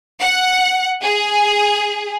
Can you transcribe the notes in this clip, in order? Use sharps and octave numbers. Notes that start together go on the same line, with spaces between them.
F#5
G#4